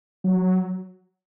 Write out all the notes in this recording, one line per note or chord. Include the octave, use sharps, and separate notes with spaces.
F#3